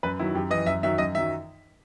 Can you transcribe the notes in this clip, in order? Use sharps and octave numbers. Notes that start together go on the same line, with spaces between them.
F#2 B4
D#3 F#3 E4
F#2 G4
E3 D#5
F#2 E5
D#3 F#3 E5
F#2 D#5
D#3 F#3 E5